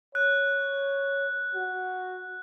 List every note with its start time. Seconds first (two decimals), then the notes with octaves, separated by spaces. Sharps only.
0.15 C#5 F#6
1.55 F#4